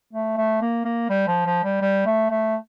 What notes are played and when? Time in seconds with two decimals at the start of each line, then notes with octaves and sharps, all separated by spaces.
0.13 A3
0.37 A3
0.61 A#3
0.85 A#3
1.09 G3
1.27 F3
1.45 F3
1.64 G3
1.81 G3
2.06 A3
2.30 A3